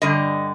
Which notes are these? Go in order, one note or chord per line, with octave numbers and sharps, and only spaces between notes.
G2 D3 G3 D#5